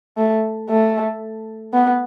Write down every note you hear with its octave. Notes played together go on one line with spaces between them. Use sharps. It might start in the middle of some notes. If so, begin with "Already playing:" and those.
A3
A3
B3